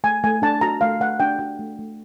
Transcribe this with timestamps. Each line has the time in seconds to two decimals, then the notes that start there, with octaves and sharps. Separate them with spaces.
0.04 A3 G#5
0.24 A3 G#5
0.42 D4 A5
0.61 F#4 A#5
0.81 A3 F5
1.00 A3 F#5
1.20 D4 G5
1.39 F#4 G5
1.59 A3
1.79 A3